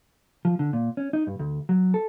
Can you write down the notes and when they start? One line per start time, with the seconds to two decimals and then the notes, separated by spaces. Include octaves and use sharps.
0.45 F3
0.59 D3
0.73 A#2
0.97 C#4
1.13 D#4
1.27 G2
1.39 D2
1.69 F#3
1.94 A4